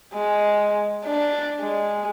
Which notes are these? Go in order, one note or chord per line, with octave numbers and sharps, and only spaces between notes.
G#3
D4
G#3